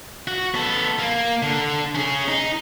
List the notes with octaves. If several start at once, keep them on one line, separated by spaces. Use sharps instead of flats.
F#4
B3 A4
A#3
D3
C#4 G#4
D#4